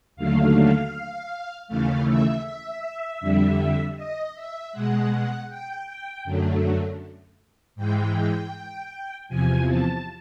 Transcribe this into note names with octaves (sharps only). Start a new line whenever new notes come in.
D#2 D3 F#3 A3 F5
D#2 C#3 E3 A3 F5
E5
E5
F2 D3 G3
D#5
E5
B2 G#3 F#5
G5
G5
F#2 D3 F#3 A3
G#2 E3 G#3 G5
E2 C3 F3 G#5
A5